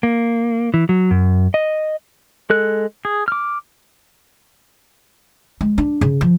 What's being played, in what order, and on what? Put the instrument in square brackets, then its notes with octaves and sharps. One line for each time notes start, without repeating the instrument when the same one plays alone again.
[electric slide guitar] A#3
E3
F#3
F#2
D#5
[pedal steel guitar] G#3 A4 F#6
G#4
D6 F6
[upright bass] G#3
D4
C#3
F3